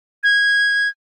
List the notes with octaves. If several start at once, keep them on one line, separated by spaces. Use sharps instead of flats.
G#6